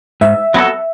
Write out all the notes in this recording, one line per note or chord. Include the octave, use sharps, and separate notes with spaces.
G#2 E5
F#3 B3 F#4 A4